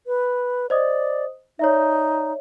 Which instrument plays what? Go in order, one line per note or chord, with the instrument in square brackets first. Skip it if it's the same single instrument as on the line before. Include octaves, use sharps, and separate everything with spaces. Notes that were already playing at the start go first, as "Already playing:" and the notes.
[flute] B4
[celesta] C5 D#5 D#6 [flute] D5
[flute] D#4 [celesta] C#5 D5 E5